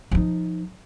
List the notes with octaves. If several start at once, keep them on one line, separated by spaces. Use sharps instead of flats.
F3 D#4